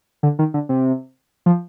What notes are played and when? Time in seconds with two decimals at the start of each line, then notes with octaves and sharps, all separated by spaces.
0.23 D3
0.39 D#3
0.54 D3
0.69 C3
1.46 F3